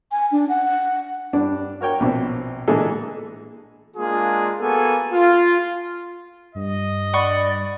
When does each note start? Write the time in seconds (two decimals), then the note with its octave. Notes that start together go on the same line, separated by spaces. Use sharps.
0.12 G#5
0.32 D4
0.49 F#5
1.33 G2 D4
1.81 F#4 A#4 C#5 G5
2.00 A#1 B2 C4
2.68 A#2 D3 E3 G#3 G#4 A4
3.97 G#3 A#3 D4 F4 G#4
4.59 A#3 B3 F#4 G#4 A4 G#5
5.12 F4
6.55 G2 D#5
7.13 D5 F#5 B5 C#6